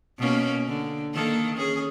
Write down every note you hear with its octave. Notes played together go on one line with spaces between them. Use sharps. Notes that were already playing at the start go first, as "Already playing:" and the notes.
B2 A#3 C#4
D3
D#3 A#3 A4
C#4 G#4